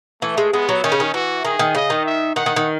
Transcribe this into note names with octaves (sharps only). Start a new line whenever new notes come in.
E3 A3
G#3
G#3 B3
F#3
D#3 C#4
C#3
D#3
E3 F#4
D#3 G#4
D#3
C#3 D#5
D#3
E5
D#3 F#5
D#3
D#3